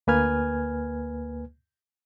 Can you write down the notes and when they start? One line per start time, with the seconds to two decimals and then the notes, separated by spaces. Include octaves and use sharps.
0.07 D2 A#3 B4 G#5 F6 G#6